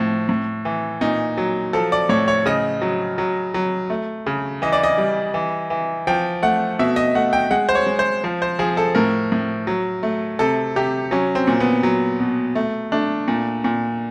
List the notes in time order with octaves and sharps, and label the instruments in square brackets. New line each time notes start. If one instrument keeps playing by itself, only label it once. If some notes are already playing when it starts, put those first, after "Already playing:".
Already playing: [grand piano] A2 F3
A2
E3
A#2 D#4
F#3
F3 A4
D5
A2 C#5
C#5
C#3 D#5
F#3
F#3
F#3
A3
C#3
E3 D#5
D5
D#5
G3
E3
E3
F3 G5
A3 F#5
B2 E5
D#5
A3 F#5
G5
G#3 F#5
C5
C#5
G#3
C5
F3
C5
F3 G#4
A4
A2 A#4
A2
F#3
A3
C3 A4
C3 G4
F#3 C#4
C4
A#2
B3
F#3
B2
A3
A3 D4
A#2
A#2